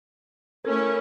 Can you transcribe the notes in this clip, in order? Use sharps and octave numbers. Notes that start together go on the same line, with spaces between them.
A3 C#4 E4 A4 A#4 G#6